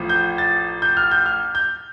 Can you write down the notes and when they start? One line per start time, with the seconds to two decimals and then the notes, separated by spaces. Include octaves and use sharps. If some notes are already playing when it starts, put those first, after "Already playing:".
Already playing: A1 A2 F3
0.09 G6
0.38 A6
0.82 G6
0.97 F6
1.11 G6
1.26 F6
1.55 G6